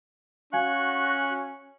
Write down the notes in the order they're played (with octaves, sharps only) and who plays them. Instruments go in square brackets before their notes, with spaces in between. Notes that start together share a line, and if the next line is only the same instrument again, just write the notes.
[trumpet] C#4 [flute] F#4 [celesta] F5 G#5 G#6 [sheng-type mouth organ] C#6 F#6